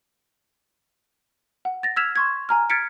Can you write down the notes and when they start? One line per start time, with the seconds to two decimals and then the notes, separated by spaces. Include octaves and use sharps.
1.65 F#5
1.83 A6 A#6
1.96 E6 F6 G#6 B6 E7 F7
2.16 C6 C#6 G#6
2.49 G#5 A#5 F6
2.70 F6 G#6 A6 B6 C#7 D7